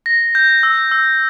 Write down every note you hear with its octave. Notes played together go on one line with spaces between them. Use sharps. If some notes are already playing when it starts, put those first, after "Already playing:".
A#6
G6
E6
E6